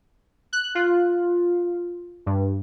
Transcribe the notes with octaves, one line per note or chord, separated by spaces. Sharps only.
F#6
F4
G2